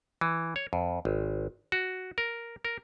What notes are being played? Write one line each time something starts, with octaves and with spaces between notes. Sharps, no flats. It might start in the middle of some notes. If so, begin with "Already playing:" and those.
E3
C#5
F2
G#1
F#4
A#4
A#4